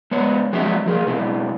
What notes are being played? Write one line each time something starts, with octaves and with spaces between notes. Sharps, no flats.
G#3 B3 C#5
F3 G#3 C4 F#4 D#5 E5
F3 G#4 A#4
B2 G#3 C4 E4